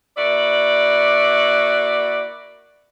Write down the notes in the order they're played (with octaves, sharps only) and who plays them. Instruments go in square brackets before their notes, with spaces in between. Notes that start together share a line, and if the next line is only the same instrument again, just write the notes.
[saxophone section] A#3 E4 F#4 D5